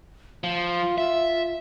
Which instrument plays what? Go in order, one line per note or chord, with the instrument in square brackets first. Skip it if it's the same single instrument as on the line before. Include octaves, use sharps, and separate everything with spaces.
[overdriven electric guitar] F3 [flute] F4
[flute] F4 [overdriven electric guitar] E5